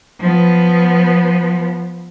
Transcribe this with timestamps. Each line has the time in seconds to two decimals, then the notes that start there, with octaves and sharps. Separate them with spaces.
0.20 F3 B3